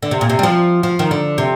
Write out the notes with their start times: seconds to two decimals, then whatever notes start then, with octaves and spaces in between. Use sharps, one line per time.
0.03 D3
0.11 C3
0.21 A#2
0.29 C3
0.39 G3
0.43 F3
0.83 F3
0.99 D#3
1.11 D3
1.38 C3